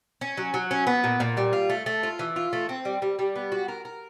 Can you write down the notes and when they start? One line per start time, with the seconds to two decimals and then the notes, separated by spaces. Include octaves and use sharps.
0.21 C#4
0.37 F#3
0.54 F#3
0.71 C#4
0.87 B3
1.04 A#2
1.20 A#2
1.37 G3
1.53 F4
1.70 A3
1.86 A3
2.03 F4
2.19 E3
2.36 F4
2.53 A3
2.69 C4
2.85 G3
3.02 G3
3.19 G3
3.36 B3
3.52 F#4
3.68 A#4
3.85 A#4